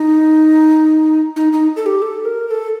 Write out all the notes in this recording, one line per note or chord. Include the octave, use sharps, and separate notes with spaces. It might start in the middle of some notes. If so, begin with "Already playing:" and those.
Already playing: D#4
D#4
D#4
A4
G4
A4
A#4
A#4
A4